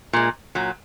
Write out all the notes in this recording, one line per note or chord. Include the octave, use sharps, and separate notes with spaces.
A#2 G#3
A#2 F#3